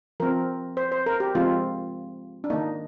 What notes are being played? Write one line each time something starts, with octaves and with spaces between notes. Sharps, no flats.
F3 C4 A#4
C5
C5
A#4
G4
F3 G#3 C4 F4
D4
D#3 A#3 D#4